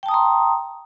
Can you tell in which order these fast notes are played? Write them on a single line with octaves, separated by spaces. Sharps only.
G5 A5 D#6 A#5 C6